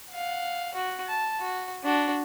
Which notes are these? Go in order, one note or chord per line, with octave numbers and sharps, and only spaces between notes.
F5 F#5
F#4
A5
F#4
D4 F#4